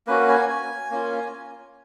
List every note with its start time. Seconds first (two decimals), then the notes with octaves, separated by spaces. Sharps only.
0.07 A#3 C#4 F#4 B4
0.28 G#5
0.49 G#5
0.91 A#3 C#4 F4